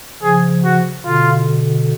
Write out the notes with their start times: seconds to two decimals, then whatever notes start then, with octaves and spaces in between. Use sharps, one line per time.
0.22 C#3 F3 G#4
0.64 F#4
1.05 B2 D3 F4